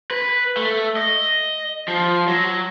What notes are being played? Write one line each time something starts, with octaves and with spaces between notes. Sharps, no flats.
B4
A3
D#5
F3
F#3